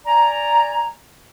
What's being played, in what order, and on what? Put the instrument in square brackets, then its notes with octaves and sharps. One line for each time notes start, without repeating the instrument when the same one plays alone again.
[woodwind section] D5 G#5 A#5